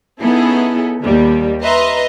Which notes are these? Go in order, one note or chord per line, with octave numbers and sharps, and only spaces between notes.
B3 C#4 D#4 E4 G#4 A4
D#2 G3
B4 D#5 E5 A#5 C6